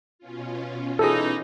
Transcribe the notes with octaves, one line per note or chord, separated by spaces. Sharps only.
B2 C#4 F4
E3 D#4 G#4 A4